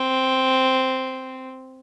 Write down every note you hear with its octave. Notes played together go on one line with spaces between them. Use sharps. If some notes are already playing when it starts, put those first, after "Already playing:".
Already playing: C4